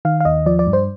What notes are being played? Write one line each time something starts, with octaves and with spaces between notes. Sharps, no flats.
D#3 F5
F5
D#2 D#5
F3 D5
D5
G2
C5